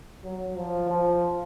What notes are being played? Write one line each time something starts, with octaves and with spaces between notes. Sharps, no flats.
F#3
F3
F3